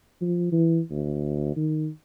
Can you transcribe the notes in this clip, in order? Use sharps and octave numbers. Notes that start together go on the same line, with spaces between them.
F3
E3
D2
D#3